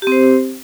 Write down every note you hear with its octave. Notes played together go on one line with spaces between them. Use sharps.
C4 G4 C5